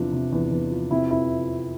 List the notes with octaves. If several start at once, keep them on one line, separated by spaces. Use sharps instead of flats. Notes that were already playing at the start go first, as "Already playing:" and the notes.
Already playing: E2 C3 F3 D4
C3
E2
E2
F3
C3 E4
F2 E4